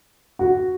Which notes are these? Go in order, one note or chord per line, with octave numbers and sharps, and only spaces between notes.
F#4